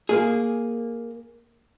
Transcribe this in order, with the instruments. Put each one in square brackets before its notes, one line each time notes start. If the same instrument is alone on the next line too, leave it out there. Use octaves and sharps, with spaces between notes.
[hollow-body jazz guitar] A#3 G#4